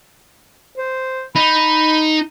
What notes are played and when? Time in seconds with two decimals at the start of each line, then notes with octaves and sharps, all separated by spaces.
0.78 C5
1.36 D#4 B5